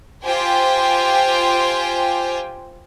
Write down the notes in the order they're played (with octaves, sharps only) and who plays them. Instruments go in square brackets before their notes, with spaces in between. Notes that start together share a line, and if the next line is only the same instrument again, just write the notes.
[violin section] F4 G4 C5 G5 G#5